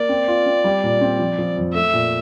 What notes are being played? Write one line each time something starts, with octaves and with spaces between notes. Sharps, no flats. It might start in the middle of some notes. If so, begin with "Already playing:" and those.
Already playing: A#3 D5
C4
F4
C4
G3
A#2
C4
F3
F3
F2
A3 E5
A#2